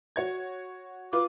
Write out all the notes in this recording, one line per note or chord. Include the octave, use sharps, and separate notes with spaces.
F#4 C#5 G#6
F4 B4 D6